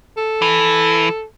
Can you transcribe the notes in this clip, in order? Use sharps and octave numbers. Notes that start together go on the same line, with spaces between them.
A4
E3